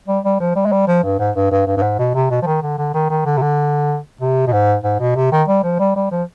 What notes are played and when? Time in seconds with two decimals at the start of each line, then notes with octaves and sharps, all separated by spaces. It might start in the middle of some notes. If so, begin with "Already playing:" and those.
0.08 G3
0.25 G3
0.40 F3
0.56 G3
0.66 G#3
0.72 G3
0.88 F3
1.03 G2
1.20 G#2
1.36 G2
1.51 G2
1.67 G2
1.77 G2
1.83 G#2
1.99 B2
2.15 C3
2.31 B2
2.42 F3
2.46 D#3
2.62 D3
2.78 D3
2.94 D#3
3.10 D#3
3.26 D3
3.38 C3
3.42 D3
4.21 C3
4.47 B2
4.53 G#2
4.84 G#2
5.01 B2
5.16 C3
5.32 D#3
5.48 G3
5.64 F3
5.80 G3
5.96 G3
6.12 F3